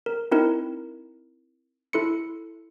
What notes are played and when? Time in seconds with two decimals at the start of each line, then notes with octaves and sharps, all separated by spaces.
0.06 A#4
0.31 C4 D#4 E4 A#4
1.93 E4 A4 C6 C#7